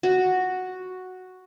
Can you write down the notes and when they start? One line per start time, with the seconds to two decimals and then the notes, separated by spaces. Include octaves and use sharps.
0.03 F#4